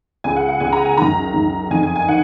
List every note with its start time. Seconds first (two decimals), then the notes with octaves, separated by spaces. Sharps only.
0.24 C#2 C#3 G#5
0.36 F#5
0.49 F#5
0.60 C#2 C#3 G#5
0.73 A#5
0.85 G#5
0.97 F#2 D#3 A#5
1.34 F#2 D#3
1.71 F2 D#3 G#5
1.83 G#5
1.96 G#5
2.08 D#3 F#5